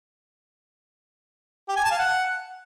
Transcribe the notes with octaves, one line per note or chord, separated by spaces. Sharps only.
G4
G#5
A5
F5
F#5